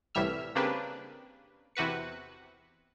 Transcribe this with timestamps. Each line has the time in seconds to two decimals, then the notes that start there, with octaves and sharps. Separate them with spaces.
0.15 C2 A2 E3 G3 E5 F6
0.55 C#3 A#3 C4 D4 G4 B4
1.75 E2 C3 F#4 B4 C#7